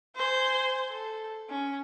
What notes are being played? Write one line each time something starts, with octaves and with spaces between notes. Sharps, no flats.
C5 G#5
A4
C#4